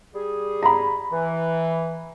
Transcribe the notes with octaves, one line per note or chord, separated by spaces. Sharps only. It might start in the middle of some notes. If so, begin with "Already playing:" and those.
G3 G#4
A#5 B5
E3